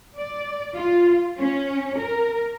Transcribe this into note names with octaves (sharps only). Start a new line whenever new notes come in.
D5
F4
C#4
A#4